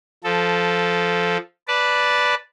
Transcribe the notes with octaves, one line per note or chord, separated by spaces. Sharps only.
F3 A4
B4 D5 A5